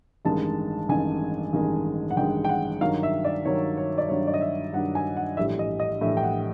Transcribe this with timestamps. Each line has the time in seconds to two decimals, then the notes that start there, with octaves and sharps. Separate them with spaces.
0.25 A1 G2 D#3 G#3 A5
0.89 A1 G2 D#3 G#3 G#5
1.53 A1 G2 D#3 G#3
2.11 F#5
2.17 A1 G2 D#3 G#3 G5
2.45 G5
2.49 F#5
2.81 G2 D#3 F#3 F5
3.03 E5
3.24 D5
3.45 G2 D#3 F#3 C#5
3.77 C#5
3.98 D5
4.09 G2 D#3 F#3 C#5
4.27 D5
4.34 D#5
4.41 E5
4.73 G2 D#3 F#3 F#5
4.95 G#5
5.17 F#5
5.37 A#1 A2 E3 G3 E5
5.59 D#5
5.80 D#5
6.01 A#1 A2 E3 G3 E5
6.17 G5
6.23 F#5